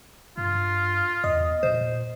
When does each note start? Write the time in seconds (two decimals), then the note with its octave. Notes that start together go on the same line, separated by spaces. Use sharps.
0.37 G2 F4
1.24 E2 D#5
1.63 A#2 C5